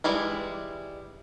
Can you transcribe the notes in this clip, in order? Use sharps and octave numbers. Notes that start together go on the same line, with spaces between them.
E3 G3 G#3 E4